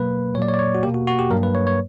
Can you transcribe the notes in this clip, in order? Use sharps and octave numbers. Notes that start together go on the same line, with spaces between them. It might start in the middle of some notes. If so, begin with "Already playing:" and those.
Already playing: B2 F#3 A#3 B4
A#2 F#3 A#3 C#5 D5
C#5
D5
C#5
F#4
B2 A#3 G4
F#4
F#4
G4
G2 F#3 A#3 A#4
B4
C#5
C#5